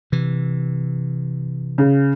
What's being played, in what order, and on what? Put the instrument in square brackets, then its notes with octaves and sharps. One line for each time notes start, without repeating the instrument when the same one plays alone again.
[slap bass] C3 E3
[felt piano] C#3